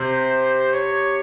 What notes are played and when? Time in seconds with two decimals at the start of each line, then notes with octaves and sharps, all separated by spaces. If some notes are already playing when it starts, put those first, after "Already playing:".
Already playing: C3 C5
0.73 C#5